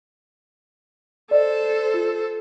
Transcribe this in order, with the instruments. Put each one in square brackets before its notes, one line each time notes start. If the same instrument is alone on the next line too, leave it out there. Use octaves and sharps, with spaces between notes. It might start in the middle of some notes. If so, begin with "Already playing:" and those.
[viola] A4 C5 [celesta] D5 D#5
[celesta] F4